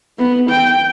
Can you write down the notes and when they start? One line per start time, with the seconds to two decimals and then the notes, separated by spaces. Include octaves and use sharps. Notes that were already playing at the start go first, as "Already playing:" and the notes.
0.19 B3
0.50 G5